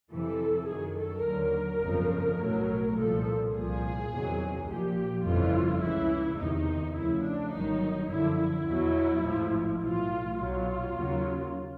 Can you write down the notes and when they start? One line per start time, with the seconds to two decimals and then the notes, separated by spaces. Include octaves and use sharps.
0.10 F2 C3 E3 A4
0.68 F#2 D#3 F#3 G#4
0.97 A4
1.25 D#2 D3 F#3 A#4
1.82 G1 F2 C#3 F3
2.38 B1 A2 F#3
2.96 C2 A#2 F3 A4
3.53 C2 A#2 F3 G#4
4.10 E2 C3 D#3 F#3
4.67 A#1 A#2 F3 G4
5.24 G1 F2 C#3 E3 F4
5.82 C#2 C#3 E3 E4
6.38 E2 C3 D#3 D#4
6.95 D2 C#3 F3 E4
7.24 D4
7.53 G1 G2 D#3 F#3 D#4
8.10 F#2 D3 F3 E4
8.38 E4
8.67 E2 B2 F#3
9.24 A1 G#2 F3
9.81 B1 A2 E3 F4
10.38 B1 B2 F#3 F4
10.95 D#2 C#3 F#3